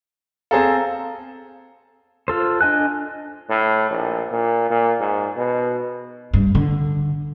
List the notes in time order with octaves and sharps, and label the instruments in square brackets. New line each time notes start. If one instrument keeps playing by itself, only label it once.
[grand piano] C4 G#4 A4 [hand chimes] F5 A#5
[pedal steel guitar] F4 A4 C5
D4 D#5 G#5 F#6
[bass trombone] A2
A#1
A#2
A#2
G#2
B2
[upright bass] G2
D3